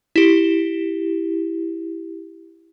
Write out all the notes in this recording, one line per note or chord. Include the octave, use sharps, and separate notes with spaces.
E4 G4